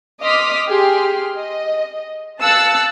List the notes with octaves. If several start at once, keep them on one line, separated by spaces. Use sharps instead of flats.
D#5 C6 D6 D#6 F6 B6
G4 G#4 C6 F6
D#5
F5 A5 E6 F#6 A6 C#7